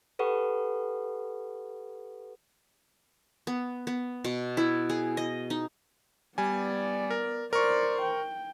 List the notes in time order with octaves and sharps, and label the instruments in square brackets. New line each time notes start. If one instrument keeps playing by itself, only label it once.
[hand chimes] G4 A4 B4 F#5 C#6
[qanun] B3
B3
B2
E4
G#4
D#5
D#4
[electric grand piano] G3 G#5 [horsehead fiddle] B3 D5
[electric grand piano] A#4
[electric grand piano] A#4 C#6 [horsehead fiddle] C5 D5
[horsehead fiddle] G5